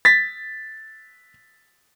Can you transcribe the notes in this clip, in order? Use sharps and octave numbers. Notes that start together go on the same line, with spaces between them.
A6 B6